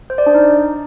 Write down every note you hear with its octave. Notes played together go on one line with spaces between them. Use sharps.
C5
D5
D4
D#4